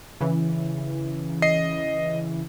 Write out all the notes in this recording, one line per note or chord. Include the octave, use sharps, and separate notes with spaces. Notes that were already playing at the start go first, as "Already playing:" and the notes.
C#3 E3
D#5 C7